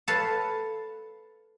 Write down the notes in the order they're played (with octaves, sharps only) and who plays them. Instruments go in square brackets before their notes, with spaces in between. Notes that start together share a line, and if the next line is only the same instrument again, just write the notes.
[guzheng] A4 B4 C#5 F5 A5